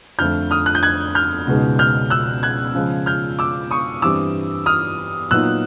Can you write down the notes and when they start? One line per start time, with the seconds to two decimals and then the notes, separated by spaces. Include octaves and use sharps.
0.19 F2 D3 F3 A3 F6 G6
0.51 D#6 F6
0.66 F#6
0.75 G6
0.83 F#6 G#6
1.15 F6 G6
1.47 C#2 B2 G#3 B3 D#4
1.79 F6 G6
2.10 E6 F#6
2.43 F#6 G#6
2.74 C#3 F3 G#3
3.06 F6 G6
3.39 D6 E6
3.71 C#6 D#6
4.02 G2 E3 G3 C4 D6 E6
4.66 D#6 F6
5.31 A#2 F#3 B3 D#4 E6 F#6